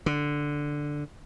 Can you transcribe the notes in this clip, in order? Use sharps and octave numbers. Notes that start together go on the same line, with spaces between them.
D3